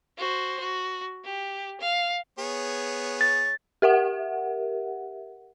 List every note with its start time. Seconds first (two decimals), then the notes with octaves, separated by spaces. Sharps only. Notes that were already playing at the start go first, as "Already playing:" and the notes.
0.17 F#4 C5
0.59 F#4
1.24 G4
1.80 F5
2.39 B3 G#4 C#5
3.21 A6
3.82 G4 A#4 E5 F#5